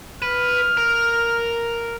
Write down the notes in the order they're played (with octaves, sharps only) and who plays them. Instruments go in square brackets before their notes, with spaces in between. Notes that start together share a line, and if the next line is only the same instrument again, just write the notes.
[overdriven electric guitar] B4 [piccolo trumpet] F6
[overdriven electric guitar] A#4